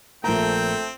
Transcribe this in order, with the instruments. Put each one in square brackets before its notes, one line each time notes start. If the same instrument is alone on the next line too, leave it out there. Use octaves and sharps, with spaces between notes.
[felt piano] A#1 A#4 A#5 [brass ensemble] A3 [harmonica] C4 G5